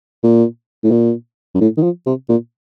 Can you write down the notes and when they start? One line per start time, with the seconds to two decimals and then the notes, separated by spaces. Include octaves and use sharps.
0.23 A#2
0.83 A2
0.91 A#2
1.55 F#2
1.61 A2
1.77 D#3
1.83 F3
2.06 C3
2.29 A#2